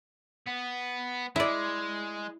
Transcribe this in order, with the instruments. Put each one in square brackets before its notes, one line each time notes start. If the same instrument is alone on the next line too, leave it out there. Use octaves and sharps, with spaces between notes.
[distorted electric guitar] B3
[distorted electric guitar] G#3 [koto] E4 D5